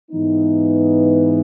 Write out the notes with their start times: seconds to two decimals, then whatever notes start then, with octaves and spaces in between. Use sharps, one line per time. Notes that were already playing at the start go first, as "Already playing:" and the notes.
0.10 G#2 E3 B3 D#4